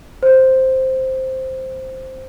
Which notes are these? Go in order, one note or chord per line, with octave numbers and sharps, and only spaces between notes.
C5